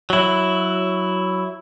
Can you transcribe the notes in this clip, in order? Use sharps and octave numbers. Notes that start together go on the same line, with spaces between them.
F#3 E4